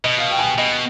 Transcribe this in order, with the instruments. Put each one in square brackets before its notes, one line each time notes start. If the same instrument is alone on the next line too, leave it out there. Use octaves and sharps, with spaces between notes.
[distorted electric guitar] B2 [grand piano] D#5
[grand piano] F5
G5
G#5
G5
[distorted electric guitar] B2 [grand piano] D#5